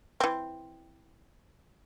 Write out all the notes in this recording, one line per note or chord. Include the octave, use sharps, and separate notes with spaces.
E3 C4